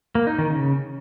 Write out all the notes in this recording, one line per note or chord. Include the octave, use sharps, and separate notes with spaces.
A#3
D#4
D#3
C#3